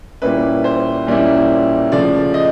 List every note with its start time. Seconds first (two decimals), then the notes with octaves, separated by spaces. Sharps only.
0.22 A#2 G3 A#3 C#4 E4 B4
0.64 C5
1.07 A#2 G3 A#3 C#4 E4
1.92 C#3 F3 A3 D5
2.34 D#5